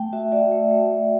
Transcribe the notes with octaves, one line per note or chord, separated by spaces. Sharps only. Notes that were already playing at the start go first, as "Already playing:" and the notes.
Already playing: A3 G5
F#4 E5
F#4 D5
A3 E5
A3
A3